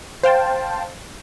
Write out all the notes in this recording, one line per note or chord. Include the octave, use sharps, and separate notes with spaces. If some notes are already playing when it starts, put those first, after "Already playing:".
C5 F5 G5 A5